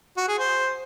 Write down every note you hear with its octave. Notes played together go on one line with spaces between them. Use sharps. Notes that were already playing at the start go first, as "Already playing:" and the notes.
F#4
G#4
C5